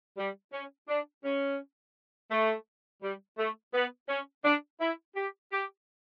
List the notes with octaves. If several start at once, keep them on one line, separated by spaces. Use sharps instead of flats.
G3
C#4
D4
C#4
A3
G3
A3
B3
C#4
D4
E4
G4
G4